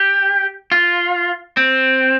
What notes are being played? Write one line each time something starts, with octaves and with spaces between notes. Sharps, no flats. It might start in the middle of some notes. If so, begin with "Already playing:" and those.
Already playing: G4
F4
C4